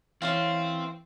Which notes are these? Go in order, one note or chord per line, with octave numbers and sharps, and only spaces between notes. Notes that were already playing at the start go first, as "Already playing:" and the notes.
E3 A3 C4 C#4 F5